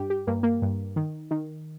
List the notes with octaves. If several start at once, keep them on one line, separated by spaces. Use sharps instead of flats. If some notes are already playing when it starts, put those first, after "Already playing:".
Already playing: G2 G4
G4
G2 A#3
A#3
G2
D#3
D#3